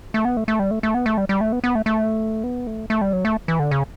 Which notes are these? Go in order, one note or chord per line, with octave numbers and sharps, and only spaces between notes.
A3
B3
A3
A3
G3
A3
A3
B3
A3
G3
G3
A3
B3
B3
A3
A3
B3
A3
A3
G3
F#3
A3
E3
D3
C#3